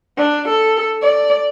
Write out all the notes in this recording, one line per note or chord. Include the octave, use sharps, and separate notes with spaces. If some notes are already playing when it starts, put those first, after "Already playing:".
D4
A4
D5